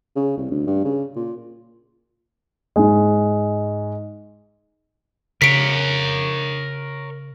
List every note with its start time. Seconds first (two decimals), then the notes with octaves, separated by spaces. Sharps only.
0.16 C#3
0.38 C2
0.51 D2
0.67 G2
0.85 C#3
1.16 A#2
2.76 G#2 G#3
5.42 C#3 A#4 C#5 B6 D7